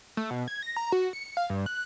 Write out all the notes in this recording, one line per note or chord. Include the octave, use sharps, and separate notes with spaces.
A3
B2
G#6
A#6
A#5
F#4
C#7
F5
G2
F#6